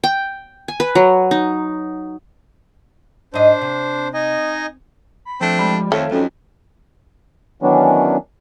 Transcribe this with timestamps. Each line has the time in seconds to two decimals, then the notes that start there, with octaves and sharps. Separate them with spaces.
0.04 G5
0.68 G#5
0.80 B4
0.95 F#3
1.31 D#4
3.34 G#2 D4 C5 D#5
3.61 C3
4.14 D#4 D#5 G#5
5.25 B5
5.41 F3 A3 C4 D4
5.59 G3 G#3 B5
5.92 F2 D#3 A3 A4 C#5 F5
6.11 F2 F#3 C#4 D#4
7.62 D#3 E3 F#3 B3 C#4 D4